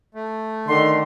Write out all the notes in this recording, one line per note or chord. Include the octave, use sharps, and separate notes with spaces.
A3
D3 D#3 C6